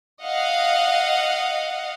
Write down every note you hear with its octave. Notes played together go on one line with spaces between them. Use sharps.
D#5 F5 F#5